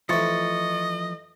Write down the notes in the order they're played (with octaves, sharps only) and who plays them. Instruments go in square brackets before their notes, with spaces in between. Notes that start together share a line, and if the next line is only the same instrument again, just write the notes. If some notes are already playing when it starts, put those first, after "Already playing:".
[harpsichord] E3 A3 [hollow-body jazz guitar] F3 [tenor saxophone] D#5 [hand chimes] C#6 A6 C#7